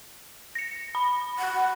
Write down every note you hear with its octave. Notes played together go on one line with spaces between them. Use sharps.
A#6 C#7
B5
F#5